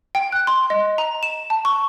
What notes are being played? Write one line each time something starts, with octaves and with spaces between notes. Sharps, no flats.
G5
F#6
C6
D#5
A#5
E7
A5
C#6